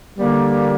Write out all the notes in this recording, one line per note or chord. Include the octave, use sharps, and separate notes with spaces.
D3 G3 A#3